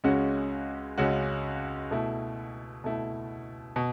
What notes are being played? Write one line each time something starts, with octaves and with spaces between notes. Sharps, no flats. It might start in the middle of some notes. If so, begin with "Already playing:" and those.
C#2 C#3 G#3 C#4 F#4
C#2 C#3 G#3 C#4 F#4
B2 A3 E4
B2 A3 E4
B2